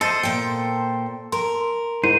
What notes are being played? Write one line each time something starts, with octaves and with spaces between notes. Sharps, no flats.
A4 C5 D#5 A5 C6
A#2 G5
A#4 C6
G#2 E4 A#4 C5 D#7